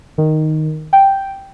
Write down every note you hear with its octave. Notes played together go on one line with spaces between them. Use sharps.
D#3
G5